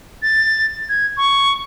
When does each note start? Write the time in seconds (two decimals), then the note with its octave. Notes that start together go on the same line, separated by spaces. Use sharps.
0.23 A6
0.89 G#6
1.17 C#6